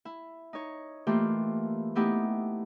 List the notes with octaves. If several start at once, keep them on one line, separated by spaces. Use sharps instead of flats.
E4
D#4 C#5
E3 A3 A#3 F4 G4
A3 B3 D#4 E4 G4